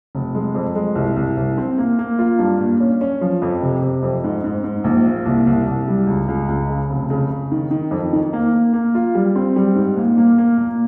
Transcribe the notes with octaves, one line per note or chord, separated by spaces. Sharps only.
F1
G#3
F2
G#3
C2
C2
C2
C4
A#3
A#3
F4
G2
A#2
C#4
C#4
F3
F2
C3
C3
F2
G#2
G#2
G#2
A#1
A#2
C2
C2
C2
G3
C#2
C#2
C#2
C#3
F1
C#3
C#3
D#3
D#3
F2
D#3
A#3
A#3
A#3
F4
G3
C4
G3
G#2
A#2
A#3
A#3
A#2